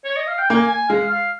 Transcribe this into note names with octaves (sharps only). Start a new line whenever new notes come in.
C#5
D#5
F5
G5
A#3 G#5
G#5
G#3 F5
F5